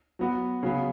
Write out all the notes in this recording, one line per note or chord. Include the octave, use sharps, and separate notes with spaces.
F#3 B3 F#4
C#3 F#3 B3